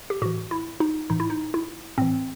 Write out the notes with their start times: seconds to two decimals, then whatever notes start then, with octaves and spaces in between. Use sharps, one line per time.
0.10 G4
0.22 A2 E3 F#4
0.51 E4
0.80 D#4
1.10 A2 E3 D#4
1.20 E4
1.30 D#4
1.54 E4
1.98 A2 E3 C4